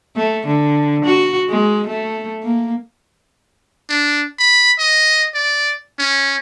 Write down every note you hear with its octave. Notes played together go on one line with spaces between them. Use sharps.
A3
D3
F#4
G#3
A3
A#3
D4
B5
D#5
D5
C#4